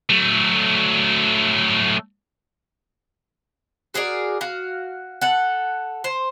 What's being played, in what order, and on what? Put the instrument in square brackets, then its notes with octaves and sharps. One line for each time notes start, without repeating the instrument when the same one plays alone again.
[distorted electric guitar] F#3 A3
[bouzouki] F#4 G#4 A#4 D5
F#4 F5
A4 F#5
C5